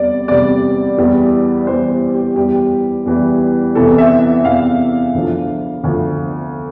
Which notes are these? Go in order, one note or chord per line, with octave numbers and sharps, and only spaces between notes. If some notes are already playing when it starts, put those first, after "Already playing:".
Already playing: E2 C3 G3 D5
E2 C3 G3 D5
E2 E3 G3
E2 E3 G3 C5
G4
E2 E3 G3 G4
E2 E3 G3
E2 C3 E3 A4
E5
E5
E2 C3 E3 F5
D2 D3 F3
D2 D3 F3